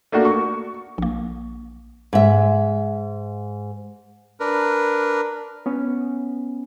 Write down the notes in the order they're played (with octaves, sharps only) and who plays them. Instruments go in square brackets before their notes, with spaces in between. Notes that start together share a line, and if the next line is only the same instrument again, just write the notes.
[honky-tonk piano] A3 A#3 D4 F#4
C#6
[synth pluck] A#1 A#3
[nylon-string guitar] G#2 E5
[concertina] D4 A#4 B4
[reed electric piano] B3 C#4